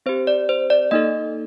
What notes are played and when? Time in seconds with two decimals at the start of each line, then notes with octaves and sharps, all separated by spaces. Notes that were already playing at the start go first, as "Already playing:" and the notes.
0.06 C4 G4 C5
0.27 D5
0.49 C5
0.70 D5
0.91 A#3 D#4 A4 D#5